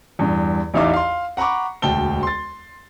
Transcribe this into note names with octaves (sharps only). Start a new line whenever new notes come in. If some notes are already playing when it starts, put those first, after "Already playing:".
E2 G2
A1 E2 D#4 E5 F5 D6
F5 C6
F#5 A#5 B5 C#6 D6
E1 D2 G5 A5 G7
C6 A6